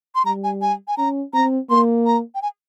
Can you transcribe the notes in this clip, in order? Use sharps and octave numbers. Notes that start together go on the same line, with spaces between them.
C6
G3 A#5
G#5
G#5
G#5
C#4 A#5
C4 A#5
A#3 C6
A#5
G5
G#5